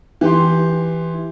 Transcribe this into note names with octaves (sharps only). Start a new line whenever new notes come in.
E3 G4 C6